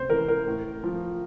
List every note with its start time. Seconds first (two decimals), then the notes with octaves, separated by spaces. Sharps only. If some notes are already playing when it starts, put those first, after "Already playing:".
Already playing: C3 C5
0.09 E3 A#4
0.28 A#4
0.47 A2
0.84 F3